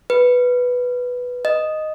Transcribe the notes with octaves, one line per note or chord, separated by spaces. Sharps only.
B4
D#5